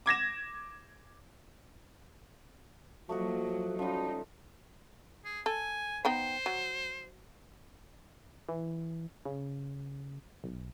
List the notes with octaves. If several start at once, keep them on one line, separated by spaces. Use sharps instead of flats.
D6 G#6 A#6 E7
F3 F#3 A3 A#3 F#4 D#5 F#5
F3 G3 C#4 D#4
G#4
A4 G#5
B3 D#4 C5 G5
F#3
E3
C#3
B1